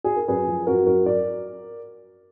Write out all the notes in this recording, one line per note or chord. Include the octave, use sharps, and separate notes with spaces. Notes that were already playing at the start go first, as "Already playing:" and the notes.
G#4
A#4
F#2 G#4 B4
F3
F#2 F#4 A#4
F#2 F#4 A#4
A#4 D5